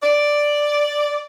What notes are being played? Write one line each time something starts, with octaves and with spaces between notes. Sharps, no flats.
D5